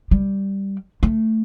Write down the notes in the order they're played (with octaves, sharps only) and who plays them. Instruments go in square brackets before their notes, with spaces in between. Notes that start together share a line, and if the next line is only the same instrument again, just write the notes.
[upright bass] G3
A3